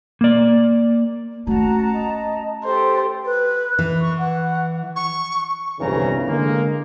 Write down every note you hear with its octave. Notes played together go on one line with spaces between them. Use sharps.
A#3 D5
A3 C#4 F#4 A5 A#5
D#5
G4 A4 C5
B4
E3
C#6
F#5
C#6
G1 C2 F2 C#3 E3 A#5
D3 G#3 A#3